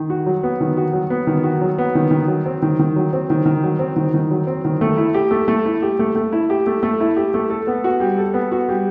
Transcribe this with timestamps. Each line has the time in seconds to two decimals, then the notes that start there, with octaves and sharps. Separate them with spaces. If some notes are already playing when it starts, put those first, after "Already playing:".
Already playing: D#3
0.10 F#4
0.26 F#3
0.43 B3
0.61 D#3
0.77 F#4
0.93 F#3
1.10 B3
1.27 D#3
1.43 F#4
1.61 F#3
1.78 B3
1.95 D#3
2.11 D#3
2.28 F#3
2.46 C4
2.62 D#3
2.79 D#3
2.96 F#3
3.13 C4
3.30 D#3
3.46 D#3
3.63 F#3
3.79 C4
3.96 D#3
4.14 D#3
4.31 F#3
4.47 C4
4.65 D#3
4.81 A3
4.97 E4
5.14 G4
5.31 A3
5.48 A3
5.66 E4
5.82 G4
5.99 A3
6.16 A3
6.32 E4
6.50 G4
6.67 A3
6.83 A3
7.00 E4
7.17 G4
7.34 A3
7.50 A4
7.67 B3
7.84 F#4
8.00 G3
8.18 A4
8.34 B3
8.52 F#4
8.69 G3